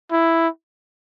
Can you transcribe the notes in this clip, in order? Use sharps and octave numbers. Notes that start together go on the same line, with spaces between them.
E4